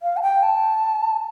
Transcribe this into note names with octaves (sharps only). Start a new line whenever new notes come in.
F5
A5
G5
A5